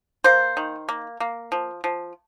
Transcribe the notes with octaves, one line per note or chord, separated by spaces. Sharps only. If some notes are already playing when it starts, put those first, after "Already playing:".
A#3 C5
D#3
A#3
A#3
F3
F3